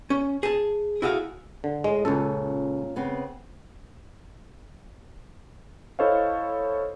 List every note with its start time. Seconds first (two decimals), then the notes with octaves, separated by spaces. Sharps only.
0.10 C#4
0.43 G#4 A5
1.02 E4 F#4 G#4 A4 F5
1.64 D3
1.84 A2 G#3 D#5
2.05 C#2 A#2 C#4 A4
2.96 C#3 B3 C4
5.99 E4 A4 C5 C#5 D#5 F5